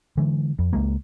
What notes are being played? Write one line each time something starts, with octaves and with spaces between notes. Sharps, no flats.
D3 E3 G#3
F2
C#2 G#3 A#3